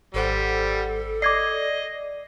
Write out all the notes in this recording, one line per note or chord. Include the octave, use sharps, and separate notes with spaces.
G#1 G3 A4 C5 F#5
D5 D#5 D6 G#6 C7